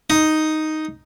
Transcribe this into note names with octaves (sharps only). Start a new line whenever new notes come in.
D#4